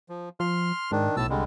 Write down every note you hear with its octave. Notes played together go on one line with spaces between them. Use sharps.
F3
F3 C6 F6
G#2 D#3 D4
B1 A2 A5 E6
C2 D3 G3 G#3